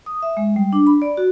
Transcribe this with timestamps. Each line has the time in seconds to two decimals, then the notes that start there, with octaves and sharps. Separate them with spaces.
0.06 D#6
0.22 E5
0.37 G#3
0.56 G3
0.73 D4
0.87 B5
1.02 D5
1.17 F#4